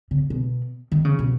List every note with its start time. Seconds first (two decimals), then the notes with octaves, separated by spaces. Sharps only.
0.11 C#3
0.30 B2
0.92 D#3
1.05 C#3
1.19 B2